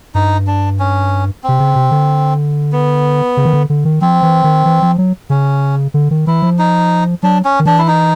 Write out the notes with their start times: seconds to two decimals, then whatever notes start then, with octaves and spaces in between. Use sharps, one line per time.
0.15 G2 D#4
0.47 D4
0.79 C#4
1.44 C3 C4
1.60 C#3
1.76 C3
1.91 D3
2.72 B3
3.37 C#3
3.45 D#3
3.53 D3
3.70 D3
3.85 D#3
4.01 F3 C4
4.23 E3
4.44 D#3
4.65 E3
4.82 F3
4.98 F#3
5.30 C#3 C#4
5.94 D3
6.11 D#3
6.27 E3 E4
6.42 F3
6.59 D#4
7.23 F#3 D4
7.45 C#4
7.59 D#3
7.66 E3 D4
7.78 E4
7.88 D#4